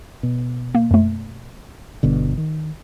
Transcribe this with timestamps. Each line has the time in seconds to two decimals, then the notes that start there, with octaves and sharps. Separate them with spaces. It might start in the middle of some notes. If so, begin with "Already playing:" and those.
0.23 B2
0.75 A#3
0.91 F#2 A3
2.03 G1 B2 D3
2.38 D#3